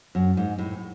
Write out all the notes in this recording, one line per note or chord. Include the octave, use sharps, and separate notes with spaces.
F#2
G#2
A2